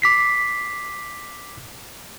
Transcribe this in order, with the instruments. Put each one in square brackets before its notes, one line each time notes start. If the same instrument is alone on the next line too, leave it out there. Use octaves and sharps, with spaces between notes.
[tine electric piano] D6 B6 C7